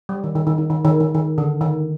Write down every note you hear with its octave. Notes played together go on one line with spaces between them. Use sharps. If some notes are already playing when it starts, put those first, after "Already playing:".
G3
D#3
D#3
D#3
D#3
D#3
D#3
D#3
D#3
D3
D#3